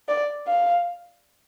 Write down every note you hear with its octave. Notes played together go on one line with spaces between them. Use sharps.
D5
F5